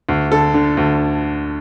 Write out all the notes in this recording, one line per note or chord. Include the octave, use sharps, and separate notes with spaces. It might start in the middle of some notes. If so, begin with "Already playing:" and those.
D2
D3 A4
D3
D2